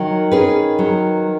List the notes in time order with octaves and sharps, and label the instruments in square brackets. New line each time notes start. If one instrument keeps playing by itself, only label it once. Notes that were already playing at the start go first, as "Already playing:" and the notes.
Already playing: [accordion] D#3 [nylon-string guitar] F#3
[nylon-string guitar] C#4 G#4 B4
F#3